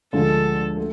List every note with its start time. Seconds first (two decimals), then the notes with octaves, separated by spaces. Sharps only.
0.13 D2 D3 F3 G#3 D4 A4
0.77 A3